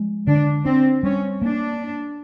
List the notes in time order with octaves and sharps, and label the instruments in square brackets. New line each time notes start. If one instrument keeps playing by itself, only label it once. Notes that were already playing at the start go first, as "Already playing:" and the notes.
Already playing: [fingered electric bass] F3 G#3
[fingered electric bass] D3 [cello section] D4
[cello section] C4 [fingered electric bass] D4
[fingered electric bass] G3 [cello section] C#4
[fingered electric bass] A#3 [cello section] D4